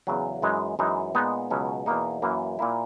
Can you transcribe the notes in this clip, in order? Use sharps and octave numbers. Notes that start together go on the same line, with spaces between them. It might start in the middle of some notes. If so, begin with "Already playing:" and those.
E2 C#3 F#3
F#2 E3 G#3 D#4
F#2 E3 G#3 D#4
A#2 G#3 B3 D#4
C#2 B2 F#3 C#4
E2 B2 A#3 D#4
F#2 E3 A#3
A#2 A#3 E4